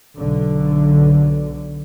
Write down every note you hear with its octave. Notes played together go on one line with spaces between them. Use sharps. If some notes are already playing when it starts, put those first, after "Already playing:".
B1 D3